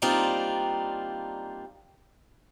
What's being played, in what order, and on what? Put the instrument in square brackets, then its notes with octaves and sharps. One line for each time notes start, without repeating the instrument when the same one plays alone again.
[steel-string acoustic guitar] G3 A#3 C4 D4 D#4 F4